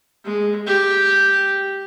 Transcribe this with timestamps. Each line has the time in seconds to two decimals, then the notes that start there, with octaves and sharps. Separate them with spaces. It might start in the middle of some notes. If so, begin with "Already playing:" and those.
0.24 G#3
0.66 G4